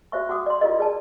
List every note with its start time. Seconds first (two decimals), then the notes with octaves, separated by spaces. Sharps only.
0.12 F#4 C5 E5 C#6
0.29 F#4 F#5 D6 D#6
0.46 D5 C6
0.61 E4 F4 G4 A#4 D5 D#5
0.79 G#4 D5 A5